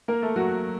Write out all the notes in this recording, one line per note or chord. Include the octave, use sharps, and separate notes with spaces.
A#3 A#4
A3 A4
F#3 F#4